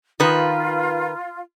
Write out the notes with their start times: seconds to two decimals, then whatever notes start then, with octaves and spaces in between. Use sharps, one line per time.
0.20 D#3 F4 B4